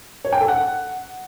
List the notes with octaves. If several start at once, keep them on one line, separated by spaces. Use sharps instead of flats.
C#5
G5
A4
F#5